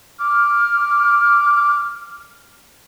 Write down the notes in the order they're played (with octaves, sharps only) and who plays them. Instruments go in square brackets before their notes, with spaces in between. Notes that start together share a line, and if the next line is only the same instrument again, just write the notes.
[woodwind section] D6 F6